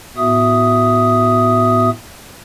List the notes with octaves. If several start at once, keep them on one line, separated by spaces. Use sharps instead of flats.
A2 B3 F#4 E5 D#6